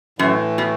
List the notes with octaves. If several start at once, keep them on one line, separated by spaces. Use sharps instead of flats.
F#2 A2 E3 A3
B2